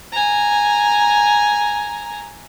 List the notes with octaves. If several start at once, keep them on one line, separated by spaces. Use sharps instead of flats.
G#5 A#5